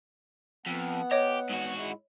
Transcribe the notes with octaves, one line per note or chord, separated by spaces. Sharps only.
F2 B3 F#5
G4 C#5 D#5
G#2 F#4
G#3 E4